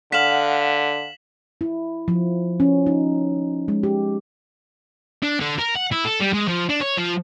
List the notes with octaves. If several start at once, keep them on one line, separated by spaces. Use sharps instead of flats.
D3 F5 F#5 B6 E7 F#7
E4
F3
C#4
D#4
G#3
G4
D4
D3
A#4
F#5
E4
A4
G3
G#3
F3
D4
C#5
F3